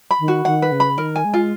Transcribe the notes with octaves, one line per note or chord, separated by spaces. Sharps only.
B5
D#3
F#4
D#3 F#5
B4
C#3
B5
D#3 A#4
G#5
G#3
F4